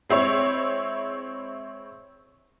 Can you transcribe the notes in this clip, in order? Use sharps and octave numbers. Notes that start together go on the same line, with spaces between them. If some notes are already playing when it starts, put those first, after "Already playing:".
G#3 C4 E4 C#5